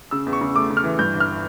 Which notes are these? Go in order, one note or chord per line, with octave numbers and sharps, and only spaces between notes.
C#3 E6
E2
C#6
C#3
A3 D6
C#3
F6
E3
G2 G6
G1
F6